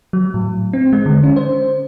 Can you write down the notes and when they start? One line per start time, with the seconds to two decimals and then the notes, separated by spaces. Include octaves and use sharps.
0.13 F#3
0.34 A2
0.73 C4
0.93 G#3
1.06 D3
1.24 C#4
1.36 C5